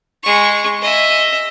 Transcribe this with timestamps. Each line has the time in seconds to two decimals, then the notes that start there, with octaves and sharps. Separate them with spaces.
0.23 G#3 C#6
0.82 D#5 E5